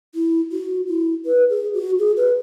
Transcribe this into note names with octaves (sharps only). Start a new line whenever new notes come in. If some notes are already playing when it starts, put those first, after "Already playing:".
E4
F#4
E4
B4
G#4
F#4
G#4
B4